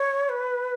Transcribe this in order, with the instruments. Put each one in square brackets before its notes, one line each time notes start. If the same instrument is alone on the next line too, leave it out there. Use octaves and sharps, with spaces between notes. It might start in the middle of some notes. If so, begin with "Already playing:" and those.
Already playing: [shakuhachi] C#5
B4